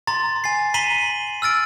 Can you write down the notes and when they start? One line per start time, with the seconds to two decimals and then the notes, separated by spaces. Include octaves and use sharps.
0.07 A#5 C6 A6
0.44 G#5 A6 C7
0.74 A#5 B6 C7 D#7 F#7 G7
1.42 E6 F6 A6 D7